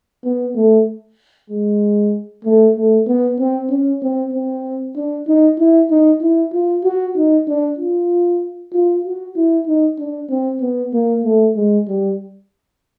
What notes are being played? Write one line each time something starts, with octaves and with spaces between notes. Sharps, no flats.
B3
A3
G#3
A3
A3
B3
C4
C#4
C4
C4
D4
D#4
E4
D#4
E4
F4
F#4
D#4
D4
F4
F4
F#4
E4
D#4
D4
C4
B3
A#3
A3
G#3
G3